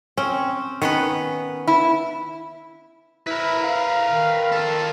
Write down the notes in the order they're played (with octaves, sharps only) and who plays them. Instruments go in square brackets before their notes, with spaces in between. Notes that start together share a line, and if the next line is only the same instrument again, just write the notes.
[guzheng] C4 [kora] C#4
[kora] D#3 [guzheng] B3 C#4 B4
[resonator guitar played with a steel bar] E4
[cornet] E4 [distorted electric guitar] A#4 B4
[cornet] F5
[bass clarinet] D#3
[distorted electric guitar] F4 A4